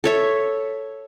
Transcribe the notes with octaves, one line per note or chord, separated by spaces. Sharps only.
A4 C#5 E5